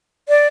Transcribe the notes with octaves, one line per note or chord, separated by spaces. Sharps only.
D5